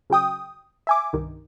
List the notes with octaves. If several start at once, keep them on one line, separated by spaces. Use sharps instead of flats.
C#3 F#3 G5 D#6
E5 G#5 D6
C2 G2 D#3